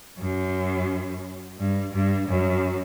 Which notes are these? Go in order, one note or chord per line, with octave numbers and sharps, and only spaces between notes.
F#2
G2
G2
F#2